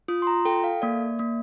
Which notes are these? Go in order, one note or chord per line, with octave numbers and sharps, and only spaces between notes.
F4 D#6
C6
A#5
A4 G5
F5
A#3 D5
A#3